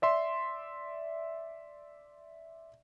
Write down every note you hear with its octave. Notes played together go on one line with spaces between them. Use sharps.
D5 E5 C6